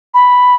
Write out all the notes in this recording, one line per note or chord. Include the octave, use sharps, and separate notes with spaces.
B5